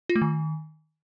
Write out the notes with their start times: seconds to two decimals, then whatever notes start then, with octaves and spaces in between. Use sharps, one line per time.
0.09 F4
0.15 A3
0.22 D#3